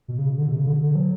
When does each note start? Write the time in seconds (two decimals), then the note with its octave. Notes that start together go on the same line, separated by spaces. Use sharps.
0.08 B2
0.19 C#3
0.38 D3
0.48 B2
0.57 C#3
0.67 D3
0.81 D3
0.95 F#3